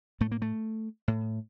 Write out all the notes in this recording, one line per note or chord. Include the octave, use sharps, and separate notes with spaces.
A2 A3
A#3
A3
A2